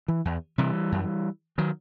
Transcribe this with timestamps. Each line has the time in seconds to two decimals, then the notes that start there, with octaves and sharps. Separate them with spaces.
0.08 E3
0.25 E2
0.58 C3 E3 G3
0.92 F#2
1.58 D#3 F#3